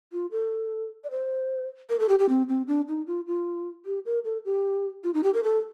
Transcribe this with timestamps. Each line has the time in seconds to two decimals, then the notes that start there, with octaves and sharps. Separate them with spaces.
0.13 F4
0.31 A4
1.04 D5
1.11 C5
1.90 A#4
1.99 A4
2.09 G4
2.19 G4
2.29 C4
2.49 C4
2.68 D4
2.88 D#4
3.07 F4
3.27 F4
3.86 G4
4.06 A#4
4.25 A4
4.45 G4
5.04 F4
5.14 D#4
5.23 G4
5.34 A#4
5.44 A4